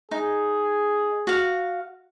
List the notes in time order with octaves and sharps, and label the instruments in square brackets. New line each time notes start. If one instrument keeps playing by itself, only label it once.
[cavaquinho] D#4 [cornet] G#4
[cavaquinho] F#4 F5